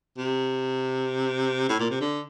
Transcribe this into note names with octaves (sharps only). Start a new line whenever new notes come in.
C3
A2
A#2
C3
D3